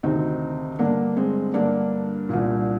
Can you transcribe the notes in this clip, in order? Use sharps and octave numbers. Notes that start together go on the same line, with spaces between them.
D2 C3 D#3 C4 D#4
G2 D3 A#3 D4
G#3 C4
G2 D3 A#3 D4
C2 A#2